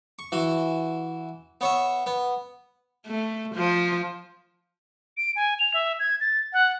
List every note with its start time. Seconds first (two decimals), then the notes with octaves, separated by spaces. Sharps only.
0.19 C#6
0.32 E3 F#4
1.61 B3 C#5 E5
2.06 B3
3.07 A3
3.55 F3
5.17 D7
5.36 G#5
5.59 F7
5.74 E5
6.00 G#6
6.21 A6
6.53 F#5